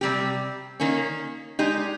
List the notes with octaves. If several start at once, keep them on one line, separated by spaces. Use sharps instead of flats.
C3 G3 C4 G4
D#3 A#3 C#4
G#3 D#4 G4